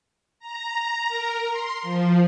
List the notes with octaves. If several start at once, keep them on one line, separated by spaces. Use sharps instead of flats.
A#5
A#5
A#4
C6
F3